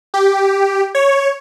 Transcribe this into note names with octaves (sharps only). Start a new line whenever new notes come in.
G4
C#5